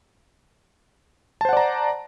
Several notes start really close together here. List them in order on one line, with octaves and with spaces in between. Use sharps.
A5 C5 F#5 D5 A#5